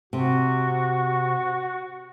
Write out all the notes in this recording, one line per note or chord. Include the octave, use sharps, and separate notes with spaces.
C3 F#4